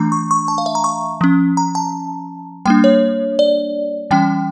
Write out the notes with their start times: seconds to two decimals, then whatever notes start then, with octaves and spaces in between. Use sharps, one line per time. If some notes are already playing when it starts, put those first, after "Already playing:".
Already playing: E3 A3 D4 A#5
0.12 C#6
0.31 C#6
0.48 A5
0.58 F5
0.66 E5
0.75 A#5
0.84 C#6
1.21 F3 C#4
1.57 A#5
1.75 A5
2.65 G3 A#3 D4 G5
2.84 C#5
3.39 D5
4.11 E3 G3 C#4 G5